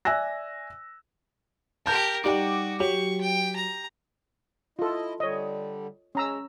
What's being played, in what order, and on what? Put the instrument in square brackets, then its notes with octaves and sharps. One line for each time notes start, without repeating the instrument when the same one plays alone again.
[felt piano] D5 E5 G#5 E6 F#6 A#6
[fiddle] G4 A#4 [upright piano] A5 G6
[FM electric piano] G3 D6 [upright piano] D#4 G5 [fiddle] F#4
[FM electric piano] F#3 [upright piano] G4 [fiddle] C#6
[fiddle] G5
A#5
[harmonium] E4 D#5 [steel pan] F4 A4
[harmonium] D3 G3 [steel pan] C#5 D#5
[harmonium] G#3 [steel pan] C#4 A#5 E6